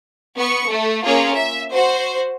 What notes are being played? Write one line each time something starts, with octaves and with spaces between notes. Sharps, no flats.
B3 C#6 C#7
A3
A#3 C#4 F4 G#4
E5
F#4 C5